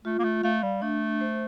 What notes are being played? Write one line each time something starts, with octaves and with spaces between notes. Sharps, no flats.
A3 F4
A#3
A3
A3 F5
G3
A3 D4
C5